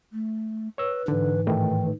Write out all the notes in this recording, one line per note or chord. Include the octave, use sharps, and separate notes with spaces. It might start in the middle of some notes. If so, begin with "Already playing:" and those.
A3
B4 C#5 E6
G#2 D3 E3
A2 D#3 A3 G5